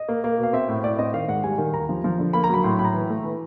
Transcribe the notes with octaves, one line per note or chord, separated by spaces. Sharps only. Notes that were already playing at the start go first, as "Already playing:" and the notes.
Already playing: D#5
A#3
A#3
B2
F5
C4 E5
A2
A2 D5
C4 D#5
D#3 F5
G#2 F#5
G3 G#5
D#3
D#2 A#5
F3
F3
D3
A#3 B5
A#5
F#3 B5
A2 C6
A2 B5
A#5
E3
A3
E3